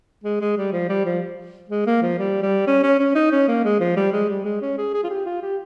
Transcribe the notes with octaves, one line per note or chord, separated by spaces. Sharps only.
G#3
G#3
G3
F3
G3
F3
G#3
A#3
F3
G3
G3
C#4
C#4
C#4
D#4
C#4
A#3
G#3
F3
G3
G#3
G3
G#3
C#4
G#4
G#4
F4
G4
F4
G4